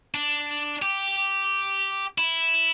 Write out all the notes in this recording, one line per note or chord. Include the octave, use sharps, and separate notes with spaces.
D4
G4
E4